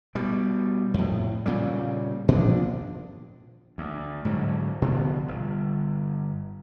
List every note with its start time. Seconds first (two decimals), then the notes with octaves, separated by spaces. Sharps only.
0.15 B2 G3
0.94 F2 A2
1.46 A#2 C#3 G3
2.28 A#2 F3 D4
3.78 D2
4.25 G#2 D3 F#3
4.82 B2 D3 F3 B3
5.28 G1